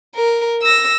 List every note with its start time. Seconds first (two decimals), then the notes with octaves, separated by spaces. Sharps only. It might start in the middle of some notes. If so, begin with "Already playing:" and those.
0.15 A#4
0.63 E6 A#6